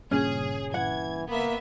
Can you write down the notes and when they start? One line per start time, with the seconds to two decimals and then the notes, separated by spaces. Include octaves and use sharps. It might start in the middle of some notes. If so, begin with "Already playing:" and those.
0.11 G2 A#2 C#3 C#4 G#4
0.74 E3 F#5 G#6
1.28 A#3 B3 E5